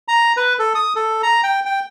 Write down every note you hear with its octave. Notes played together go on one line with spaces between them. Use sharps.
A#5
B4
A4
D#6
A4
A#5
G5
G5